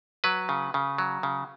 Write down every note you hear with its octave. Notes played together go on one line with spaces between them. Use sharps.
F#3 B4
C#3
C#3
F#3
C#3